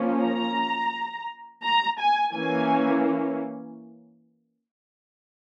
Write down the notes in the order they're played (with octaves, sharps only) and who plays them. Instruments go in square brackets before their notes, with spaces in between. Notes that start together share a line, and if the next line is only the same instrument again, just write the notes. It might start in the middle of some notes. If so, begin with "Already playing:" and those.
Already playing: [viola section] F3 A#3 C#4
A#5
A#5
G#5
E3 A#3 C#4 G#5